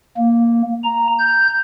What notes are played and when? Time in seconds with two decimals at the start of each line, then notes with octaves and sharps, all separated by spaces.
0.18 A#3
0.84 A#5
1.19 G6